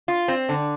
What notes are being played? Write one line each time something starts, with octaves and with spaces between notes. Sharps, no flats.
F4
C4
D3